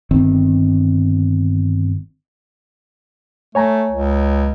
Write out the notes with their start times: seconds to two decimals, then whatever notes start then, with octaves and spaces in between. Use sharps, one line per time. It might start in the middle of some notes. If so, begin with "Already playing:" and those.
0.11 G1 D#3 C4
3.55 A3 C#5 G#5 A#5
3.91 C#2